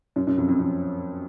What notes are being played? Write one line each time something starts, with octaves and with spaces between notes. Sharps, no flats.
F#2
F#2
F2
F2
F2